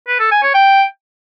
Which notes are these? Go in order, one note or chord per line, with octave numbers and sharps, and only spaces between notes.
B4
A4
G#5
C#5
G5